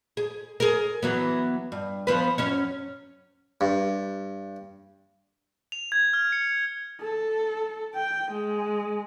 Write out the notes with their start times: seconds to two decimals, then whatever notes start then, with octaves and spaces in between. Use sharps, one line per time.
0.17 G#4
0.60 G#4 A#4
1.03 E3 F#3 B3
1.72 G2
2.07 F3 B3 B4
2.38 F#2 C#4 C#5
3.61 G2
5.72 F7
5.92 G#6
6.13 F6
6.32 C#7
7.01 A4
7.95 G5
8.31 G#3